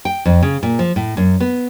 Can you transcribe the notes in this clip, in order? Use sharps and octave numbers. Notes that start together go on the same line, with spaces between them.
G5
F2
C#3
A#2
F3
A2
F#2
B3